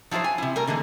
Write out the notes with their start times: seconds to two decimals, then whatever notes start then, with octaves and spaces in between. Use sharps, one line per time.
0.11 F3 F#3 E4 F4 C5
0.24 G#5
0.38 C3 E4
0.56 G3 A3 A#4
0.67 D3 E3 G#3 A#3